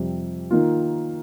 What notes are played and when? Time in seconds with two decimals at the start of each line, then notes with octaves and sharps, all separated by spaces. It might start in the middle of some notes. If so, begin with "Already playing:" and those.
Already playing: F2 C3 G3
0.51 D#3 A#3 F4